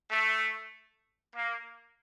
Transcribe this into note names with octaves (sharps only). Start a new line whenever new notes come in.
A3
A#3